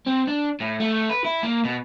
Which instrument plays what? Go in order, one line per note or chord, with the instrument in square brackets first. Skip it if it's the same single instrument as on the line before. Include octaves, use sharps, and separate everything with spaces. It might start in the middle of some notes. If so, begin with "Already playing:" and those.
[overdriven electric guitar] C4
D4
A2
A3
B4
E4
A#3
B2